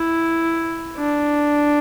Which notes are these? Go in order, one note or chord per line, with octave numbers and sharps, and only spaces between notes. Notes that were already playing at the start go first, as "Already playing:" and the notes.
Already playing: E4
D4